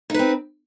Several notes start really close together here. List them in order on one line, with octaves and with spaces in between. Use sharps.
D#4 B4 C4